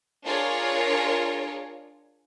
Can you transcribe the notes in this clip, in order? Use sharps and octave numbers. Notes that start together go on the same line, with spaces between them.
D4 F4 G#4 A#4 C#5